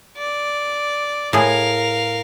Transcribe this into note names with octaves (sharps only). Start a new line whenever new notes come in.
D5
A2 G#4 A#4 F5